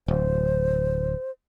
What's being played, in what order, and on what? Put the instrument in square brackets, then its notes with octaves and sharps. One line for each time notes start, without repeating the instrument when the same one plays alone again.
[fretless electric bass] D1 [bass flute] C5